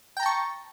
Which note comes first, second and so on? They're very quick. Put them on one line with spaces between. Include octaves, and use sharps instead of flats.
G5 A#5 A5 C#6